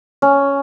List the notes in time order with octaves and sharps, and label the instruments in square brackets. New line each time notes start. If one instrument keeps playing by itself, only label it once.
[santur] C#4